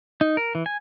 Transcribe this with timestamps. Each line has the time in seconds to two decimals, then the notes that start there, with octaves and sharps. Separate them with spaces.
0.21 D#4
0.37 A#4
0.55 E3
0.66 G#5